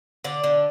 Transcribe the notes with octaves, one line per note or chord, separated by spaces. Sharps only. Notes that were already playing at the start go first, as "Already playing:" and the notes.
D3 D5
D3